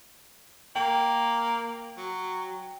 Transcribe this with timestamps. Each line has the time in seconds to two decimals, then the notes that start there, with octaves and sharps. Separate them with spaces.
0.76 A#3 G5
1.97 F#3